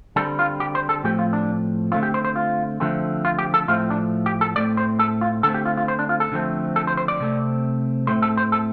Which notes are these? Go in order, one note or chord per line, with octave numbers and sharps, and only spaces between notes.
D3 G3 C4 A4
F4
G4
C5
A4
A2 F3 A3 C4 G4
F4
D4
D3 A3 C4 F4
G4
C5
C5
F4
D3 F3 A3 C4
F4
G4
A4
A2 F3 A3 C4 F4
D4
G4
A4
A2 A3 C4 D5
C5
A4
F4
D3 A3 C4 A4
G4
F4
F4
C5
D4
F4
A4
D3 F3 A3 C4
A4
C5
C5
D5
C3 A3 C4
A2 A3 C4 C5
A4
C5
A4